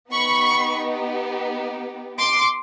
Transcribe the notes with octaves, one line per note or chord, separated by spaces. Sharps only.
B3 D#4 G4 B5 C#6
C6 D6